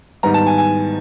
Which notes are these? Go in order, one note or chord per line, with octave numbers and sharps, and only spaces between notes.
G#2 D#3 G3 B3 A#5
A5
G#5
G#5